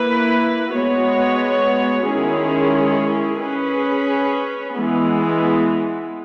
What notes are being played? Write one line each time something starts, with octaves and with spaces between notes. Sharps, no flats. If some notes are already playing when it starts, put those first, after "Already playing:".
Already playing: A#3 E4 B4
G#3 B3 F#4 C#5
D#3 G#3 C#4 E4 G#4
C#4 G#4 B4
E3 G#3 B3